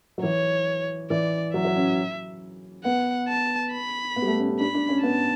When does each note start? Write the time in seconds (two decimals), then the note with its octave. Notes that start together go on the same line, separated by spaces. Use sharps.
0.18 F#3
0.23 E3 C#5
1.10 E3 D5
1.54 F#3 E5
1.65 F#3
1.76 C#4
2.85 B3 F#5
3.28 A5
3.72 B5
4.16 B3
4.22 G3
4.27 A3
4.38 C#4
4.49 C#4
4.60 D4 B5
4.74 D4
4.89 C#4
5.03 B3 A5